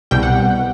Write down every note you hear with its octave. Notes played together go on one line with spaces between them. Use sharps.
C2 B2 G3 G5
F#5